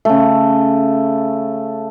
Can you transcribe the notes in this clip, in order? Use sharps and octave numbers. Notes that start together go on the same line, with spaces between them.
C#3 A3